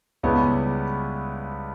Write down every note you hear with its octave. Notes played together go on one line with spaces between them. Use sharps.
C#2 C#3 G3 B3 E4